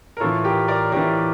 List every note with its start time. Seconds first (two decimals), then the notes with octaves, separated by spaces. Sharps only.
0.17 A#4
0.20 A2 F4 A4
0.24 E3
0.44 G4 A#4
0.68 A#4 D5
0.92 A2 E3 G4 A#4